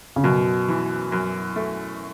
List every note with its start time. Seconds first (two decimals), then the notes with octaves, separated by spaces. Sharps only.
0.16 C#3
0.23 F#2 B2
0.68 E3
1.12 F#2
1.56 A3